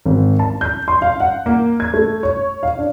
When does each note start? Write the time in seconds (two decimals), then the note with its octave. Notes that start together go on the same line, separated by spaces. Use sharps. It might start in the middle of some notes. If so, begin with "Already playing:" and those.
0.06 G#1
0.39 A5
0.61 G6
0.88 C6
1.02 F5
1.20 F#5
1.46 A#3
1.80 G#6
1.94 A3
2.23 C#5
2.63 F5
2.79 D4